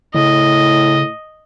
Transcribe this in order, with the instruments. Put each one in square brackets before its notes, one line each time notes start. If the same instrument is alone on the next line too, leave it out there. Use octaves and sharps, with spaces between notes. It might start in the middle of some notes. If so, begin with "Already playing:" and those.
[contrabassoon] A2 [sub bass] C#3 [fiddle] D#5